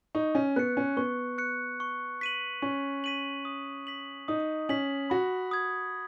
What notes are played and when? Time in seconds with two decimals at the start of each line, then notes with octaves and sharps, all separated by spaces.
0.15 D#4 C#6
0.35 C#4
0.56 B3 F#6 C#7
0.77 C#4
0.97 B3 C#6
1.38 F#6 C#7
1.80 C#6
2.21 B6 D#7 F#7
2.62 C#4 C#6
3.04 B6 D#7 F#7
3.45 D#6
3.87 B6 F#7
4.28 D#4 D#6
4.69 C#4 B6 F#7
5.10 F#4 B5
5.51 D#6 G#6